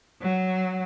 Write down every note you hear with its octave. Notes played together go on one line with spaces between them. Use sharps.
F#3